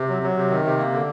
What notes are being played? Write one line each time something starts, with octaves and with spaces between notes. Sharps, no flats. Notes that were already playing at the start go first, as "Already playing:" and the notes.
Already playing: C3
F#3
F#3
C3
D#3
C3
A#3
D3